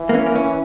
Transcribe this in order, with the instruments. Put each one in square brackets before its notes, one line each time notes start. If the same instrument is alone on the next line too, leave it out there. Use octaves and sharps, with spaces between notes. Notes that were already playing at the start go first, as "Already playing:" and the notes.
Already playing: [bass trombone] E3
[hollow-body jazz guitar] A#3
C#4
A#3
C#4